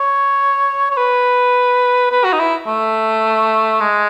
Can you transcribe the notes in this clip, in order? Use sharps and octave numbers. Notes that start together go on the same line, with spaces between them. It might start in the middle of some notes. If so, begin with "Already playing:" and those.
Already playing: C#5
C#5
B4
B4
F#4
D#4
E4
A3
G#3